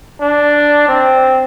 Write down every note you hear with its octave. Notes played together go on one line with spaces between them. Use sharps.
D4
C4